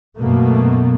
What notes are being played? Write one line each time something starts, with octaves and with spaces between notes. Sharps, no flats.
F#2 B2 A3 A#3